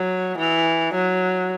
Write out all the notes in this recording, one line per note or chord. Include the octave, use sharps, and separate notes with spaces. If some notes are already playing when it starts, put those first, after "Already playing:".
Already playing: F#3
E3
F#3